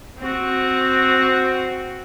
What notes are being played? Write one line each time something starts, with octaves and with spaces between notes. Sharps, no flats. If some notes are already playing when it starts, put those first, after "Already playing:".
C4 F#4